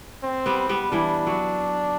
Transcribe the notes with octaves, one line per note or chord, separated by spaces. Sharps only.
C4
G3 B3
G3 B3
E3 G3 D4
F#3